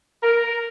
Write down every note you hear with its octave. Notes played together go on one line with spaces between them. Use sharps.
A#4